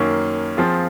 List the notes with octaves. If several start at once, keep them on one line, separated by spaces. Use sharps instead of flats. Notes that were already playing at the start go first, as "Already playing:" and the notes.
Already playing: F#2 D#3 A#3 C#4
F3 C4 F4 G#4